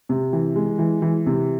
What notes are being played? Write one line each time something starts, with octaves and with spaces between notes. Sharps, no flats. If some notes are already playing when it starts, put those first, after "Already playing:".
C3
E3
G#3
E3
E3
C3